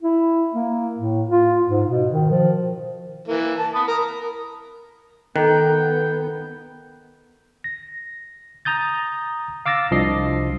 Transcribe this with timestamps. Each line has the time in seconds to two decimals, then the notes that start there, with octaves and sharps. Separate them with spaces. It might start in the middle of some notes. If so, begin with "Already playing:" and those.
0.03 E4
0.54 A#3
0.98 A2
1.29 F4
1.69 G#2
1.89 B2
2.13 D#3
2.31 F3
3.28 E3 A#3
3.58 A5
3.75 B5 D#6
3.88 A#4
5.36 D#3 B3 A4 G5 A#5 F#6
7.64 A#6
8.65 A#5 D#6 G6 A6
9.66 F5 D6 E6 A6 A#6
9.91 C2 F3 D4 D#5 C7